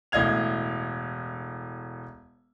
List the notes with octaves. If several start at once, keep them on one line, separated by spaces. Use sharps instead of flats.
E1 A2 D#5 F5 G#6 F7